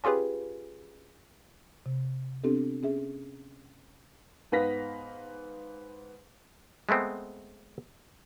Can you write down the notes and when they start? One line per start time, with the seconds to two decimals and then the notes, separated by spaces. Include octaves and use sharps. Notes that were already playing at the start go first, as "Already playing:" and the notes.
0.04 C#4 F4 G4 G#4 B4
1.86 C3
2.44 B3 C4 D4 G4 A4
2.83 C#4 G#4 E5
4.52 G#2 B3 B4 F5 A#6 B6
6.89 G#3 A3 B3 C4